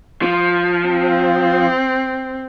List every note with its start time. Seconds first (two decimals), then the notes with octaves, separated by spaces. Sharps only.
0.22 F3
0.87 C4